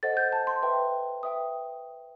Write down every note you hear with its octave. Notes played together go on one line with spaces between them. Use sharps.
A4 C5 D#5 F#5 A6
G6
A5
C6
B4 E5 G5
B4 E5 G5 D#6